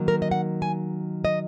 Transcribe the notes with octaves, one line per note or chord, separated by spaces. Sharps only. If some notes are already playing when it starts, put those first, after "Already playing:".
Already playing: D#3 F#3 A#3
A#4
D#5
F#5
G#5
D#5